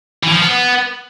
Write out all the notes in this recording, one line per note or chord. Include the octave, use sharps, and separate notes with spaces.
E3
F3
B3